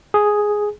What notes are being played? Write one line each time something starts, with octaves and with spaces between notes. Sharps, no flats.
G#4